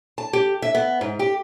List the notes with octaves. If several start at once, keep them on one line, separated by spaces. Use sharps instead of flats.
A5
G4
E5
B3
G#2
G4